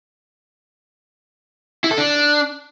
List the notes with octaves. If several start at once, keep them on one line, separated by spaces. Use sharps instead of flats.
E4
A4
D4